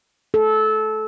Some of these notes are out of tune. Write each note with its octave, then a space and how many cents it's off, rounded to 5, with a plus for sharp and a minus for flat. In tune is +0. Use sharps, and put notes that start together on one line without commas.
A4 -20